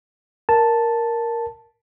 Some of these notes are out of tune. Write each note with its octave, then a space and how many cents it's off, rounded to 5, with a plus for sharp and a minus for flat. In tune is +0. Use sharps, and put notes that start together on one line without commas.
A#4 +0 A5 +0